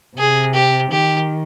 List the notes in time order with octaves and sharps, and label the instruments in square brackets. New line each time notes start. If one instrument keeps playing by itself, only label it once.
[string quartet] C3 [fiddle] G#4
[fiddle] G4
[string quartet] D#3 [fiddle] G4